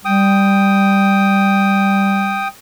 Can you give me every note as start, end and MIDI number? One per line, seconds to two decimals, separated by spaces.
0.05 2.48 55
0.05 2.48 79
0.05 2.48 87